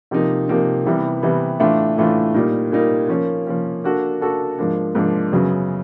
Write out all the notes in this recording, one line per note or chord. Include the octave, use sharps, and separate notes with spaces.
C3 F3 A#3 D#4
C3 F3 A#3 D#4
C3 E3 G3 B3
C3 E3 G3 B3
A2 E3 A3 D4 F4
A2 E3 A3 D4 F4
A#2 G3 A#3 D#4
A#2 G3 A#3 D#4
F3 A#3 C#4
F3 A#3 C#4
A#3 D4 F#4 A4
A#3 D4 F#4 A4
G#2 F3 A#3 D4
G#2 F3 A#3 D4
F#2 C#3 F#3 B3